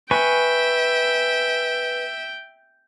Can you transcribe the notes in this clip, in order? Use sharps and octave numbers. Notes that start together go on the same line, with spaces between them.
B4 E5 G5 G#5 C#6